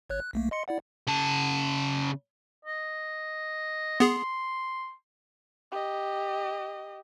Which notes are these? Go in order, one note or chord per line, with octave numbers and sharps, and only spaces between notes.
G#1 C#5 F#6
F#6
B1 A3 A#3
D#5 C6 C#7
E4 D5 F#5
C#3 A5
D#5
B3 G#4 C6
G4 D#5